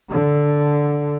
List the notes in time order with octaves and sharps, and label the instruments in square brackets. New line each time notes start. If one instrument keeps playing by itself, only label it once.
[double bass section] D3